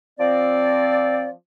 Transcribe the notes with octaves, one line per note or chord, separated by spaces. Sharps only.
F3 C4 D5